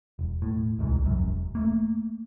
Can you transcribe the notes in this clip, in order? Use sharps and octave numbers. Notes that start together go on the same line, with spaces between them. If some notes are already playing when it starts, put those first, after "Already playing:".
E1
A2
D1 C2 G#2
C2 F#2
E1
A3 A#3